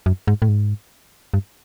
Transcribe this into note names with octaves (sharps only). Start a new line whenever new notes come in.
F#2
G#2
A2
G#2
G2